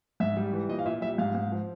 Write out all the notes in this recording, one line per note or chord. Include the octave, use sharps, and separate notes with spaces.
G#2 E5
G3
E3
A#2 D#5
F5
A#2 E5
G3 E5
G#2 F5
G#2
F3